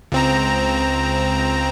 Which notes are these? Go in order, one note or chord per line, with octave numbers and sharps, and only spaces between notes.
C#2 C4 A#5